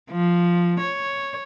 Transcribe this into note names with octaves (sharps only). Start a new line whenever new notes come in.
F3
C#5